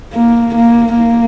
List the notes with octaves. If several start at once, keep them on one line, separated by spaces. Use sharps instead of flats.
A#3
A#3
A#3